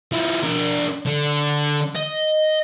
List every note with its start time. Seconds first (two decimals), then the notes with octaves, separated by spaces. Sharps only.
0.12 F3 E4
0.44 D4 A#4
1.06 D3
1.95 D#5